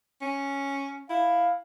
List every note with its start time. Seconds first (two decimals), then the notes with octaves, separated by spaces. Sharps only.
0.21 C#4
1.10 E4 F5